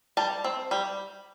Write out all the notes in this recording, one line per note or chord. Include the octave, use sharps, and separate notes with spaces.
G3 A5
C4
G3